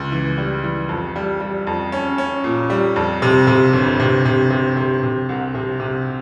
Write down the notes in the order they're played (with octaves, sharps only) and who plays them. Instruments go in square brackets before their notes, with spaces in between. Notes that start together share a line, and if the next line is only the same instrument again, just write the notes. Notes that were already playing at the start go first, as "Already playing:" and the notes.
Already playing: [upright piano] C#2
E3
G3
E3
F2
G3
G3
F2
C#4
C#4
A#2
G3
F2
C3
C3
G1
C3
C3
C3
C3
C3
C2
C3
C3